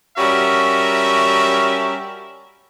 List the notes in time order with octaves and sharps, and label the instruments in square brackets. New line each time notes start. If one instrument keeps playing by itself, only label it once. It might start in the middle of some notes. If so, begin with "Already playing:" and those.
[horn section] G3 C#4 F#4 A#4 E5